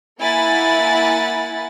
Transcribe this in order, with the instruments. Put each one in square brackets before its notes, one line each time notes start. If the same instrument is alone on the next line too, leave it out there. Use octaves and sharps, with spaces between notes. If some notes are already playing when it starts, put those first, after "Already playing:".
[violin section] A#3 E4 F#5 G#5 B5 A6